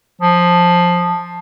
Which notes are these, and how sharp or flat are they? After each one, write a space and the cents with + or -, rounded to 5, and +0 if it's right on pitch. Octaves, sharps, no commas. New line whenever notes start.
F3 +10